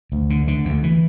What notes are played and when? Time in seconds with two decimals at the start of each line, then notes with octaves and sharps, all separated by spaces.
0.12 D2
0.30 D3
0.48 D3
0.65 D2
0.83 E3